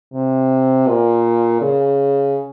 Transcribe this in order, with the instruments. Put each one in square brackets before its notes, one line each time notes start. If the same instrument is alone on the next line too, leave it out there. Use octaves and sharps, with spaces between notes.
[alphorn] C3
A#2
C#3